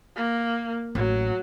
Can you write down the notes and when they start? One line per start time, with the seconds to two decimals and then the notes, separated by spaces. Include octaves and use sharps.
0.16 A#3
0.95 A1 F#3